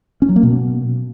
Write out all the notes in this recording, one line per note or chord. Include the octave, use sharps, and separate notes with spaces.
C#4
F#3
A#3
B2